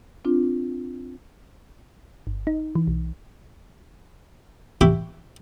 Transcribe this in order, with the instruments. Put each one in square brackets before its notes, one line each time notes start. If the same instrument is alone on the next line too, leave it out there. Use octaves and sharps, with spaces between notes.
[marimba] C4 D4 F4
[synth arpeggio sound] G1
D#4
E3
B1
[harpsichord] E4 F#4 G4 E5 G5 B5